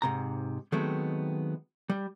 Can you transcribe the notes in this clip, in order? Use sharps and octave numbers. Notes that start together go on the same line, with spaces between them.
G#2 C3 A#5
D#3 F#3 G#3 A3 B3 C4
G3